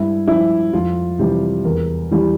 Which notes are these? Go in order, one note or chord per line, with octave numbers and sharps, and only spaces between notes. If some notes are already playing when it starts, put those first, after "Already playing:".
Already playing: G2 E4
F3 E4
F2 F4
C3 E3 G3 G4
E2 A#4
E3 G3